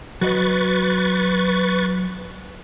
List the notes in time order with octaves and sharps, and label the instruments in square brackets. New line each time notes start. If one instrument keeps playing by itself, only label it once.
[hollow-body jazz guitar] F#3 F#4 D#5 [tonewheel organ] B4 C#6 A6